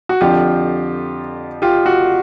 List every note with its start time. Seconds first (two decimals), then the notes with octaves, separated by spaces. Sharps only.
0.09 F#4
0.21 F2 D3 F3 F4 G4
1.62 F4 G4
1.86 F#4